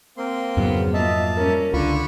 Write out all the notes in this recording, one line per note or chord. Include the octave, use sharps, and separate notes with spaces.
A#3 C4 C6
F2 G#2 C#3 F#3 B3
A#3 F4 D#5 E5 A5
G3 C#4 A#4
C#2 D3 D4 F4 B5 C#6